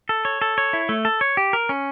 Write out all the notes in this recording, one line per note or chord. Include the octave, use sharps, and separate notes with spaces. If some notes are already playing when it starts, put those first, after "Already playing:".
A4
C#5
A4
C#5
E4
A3
A4
C#5
G4
A#4
C#4